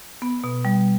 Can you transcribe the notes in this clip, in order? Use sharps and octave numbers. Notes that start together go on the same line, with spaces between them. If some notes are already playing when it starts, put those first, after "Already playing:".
B3
B2
G3